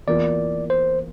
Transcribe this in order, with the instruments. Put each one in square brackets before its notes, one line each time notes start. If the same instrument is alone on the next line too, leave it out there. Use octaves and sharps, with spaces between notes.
[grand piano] E2 E3 A#3 F4 [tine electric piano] D5
[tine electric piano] C5